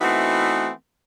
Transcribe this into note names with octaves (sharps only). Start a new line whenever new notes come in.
E3 A3 B3 C4 D#4 F#4